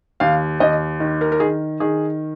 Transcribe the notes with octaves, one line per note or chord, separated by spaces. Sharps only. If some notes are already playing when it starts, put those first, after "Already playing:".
D#2 F5
D#2 D#5
D#3
A#4
A#4
D#3 G#4
D#3 G#4